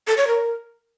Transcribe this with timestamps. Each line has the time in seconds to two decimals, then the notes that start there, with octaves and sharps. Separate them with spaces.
0.07 A4
0.17 C#5
0.27 A#4